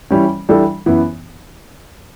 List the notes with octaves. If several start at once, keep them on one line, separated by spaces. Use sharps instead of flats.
E3 G3 C#4
E3 G3 D4 A4
F#2 E3 B3